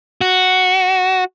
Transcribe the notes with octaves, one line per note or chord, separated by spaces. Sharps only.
F#4